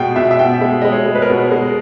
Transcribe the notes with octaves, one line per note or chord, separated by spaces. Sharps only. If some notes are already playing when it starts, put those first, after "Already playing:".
Already playing: B2 G#3 G5
B2 E5
E5
B2 G5
G#3 E5
G#3 D#5
C#5
G#3
B4
A#4
B2
G#3